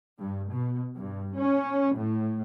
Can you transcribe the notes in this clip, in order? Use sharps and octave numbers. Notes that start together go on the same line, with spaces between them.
G2
B2
G2
C#4
A2